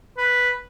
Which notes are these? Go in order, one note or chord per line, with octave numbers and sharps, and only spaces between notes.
B4